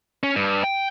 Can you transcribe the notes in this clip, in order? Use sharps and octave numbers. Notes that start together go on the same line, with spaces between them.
C#4
G2
G5